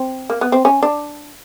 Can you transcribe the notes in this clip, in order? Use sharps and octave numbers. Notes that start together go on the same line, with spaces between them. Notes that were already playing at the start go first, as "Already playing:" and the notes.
Already playing: C4
A#3
B3
C4
C#4
D4